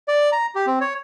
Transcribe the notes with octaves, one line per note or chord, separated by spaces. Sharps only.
D5
A#5
G4
C4
C#5